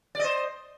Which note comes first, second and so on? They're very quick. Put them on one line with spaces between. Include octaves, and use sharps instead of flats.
D5 D#5 C5